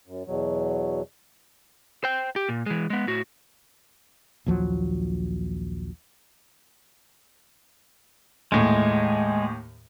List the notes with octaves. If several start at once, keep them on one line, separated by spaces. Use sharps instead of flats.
F#2
E2 B2 F#3
C5 G5
G4
A#2
E3 G#3
G#3 B3
A2 F#4
A#1 D#2 F3 F#3
D#2 A2 G#3